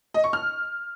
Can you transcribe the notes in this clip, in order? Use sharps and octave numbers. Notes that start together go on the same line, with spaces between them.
D#5
C#6
F6